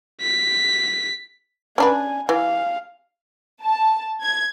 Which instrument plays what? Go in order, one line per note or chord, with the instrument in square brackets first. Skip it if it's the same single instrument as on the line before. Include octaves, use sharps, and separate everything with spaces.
[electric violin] B6
[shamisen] C#4 D4 B4 [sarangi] G#5
[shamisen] E3 [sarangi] F5
[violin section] A5
G#6